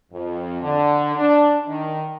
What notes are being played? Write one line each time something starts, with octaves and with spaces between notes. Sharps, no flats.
F2
D3
D4
D#3